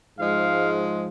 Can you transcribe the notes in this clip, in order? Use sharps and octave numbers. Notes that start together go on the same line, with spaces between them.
G#2 F3 G#3 F5